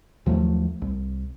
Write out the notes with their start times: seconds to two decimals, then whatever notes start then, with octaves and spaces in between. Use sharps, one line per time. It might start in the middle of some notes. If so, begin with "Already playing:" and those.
0.26 D#2 F3 F#3 A3
0.82 C2